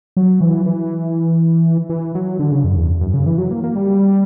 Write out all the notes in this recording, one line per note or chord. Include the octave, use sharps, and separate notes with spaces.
F#3
E3
E3
E3
F#3
D3
C#3
F#2
E2
F#2
C#3
E3
F#3
A#3
A#3
G3